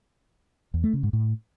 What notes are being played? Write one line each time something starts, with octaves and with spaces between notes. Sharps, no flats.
E2
A3
C#3
G#2
A2